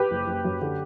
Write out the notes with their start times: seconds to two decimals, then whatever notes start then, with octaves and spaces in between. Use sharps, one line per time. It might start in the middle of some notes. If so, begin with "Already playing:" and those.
Already playing: G4 B4
0.11 F#1
0.27 F#1
0.45 F#2
0.62 D3